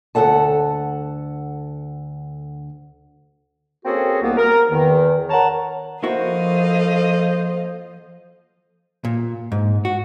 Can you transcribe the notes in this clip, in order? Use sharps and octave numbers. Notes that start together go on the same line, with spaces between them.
D2 G2 A4 F#5 A5
A#3 C4 C#4 F#4 G#4 A4
C2 A#3 B3
A#4
E2 D#3
A#4 C#5 F#5 A5 A#5
F3 A#3 E4 F#4 A4 C5 D#5 F5
A#2
G#2
F#4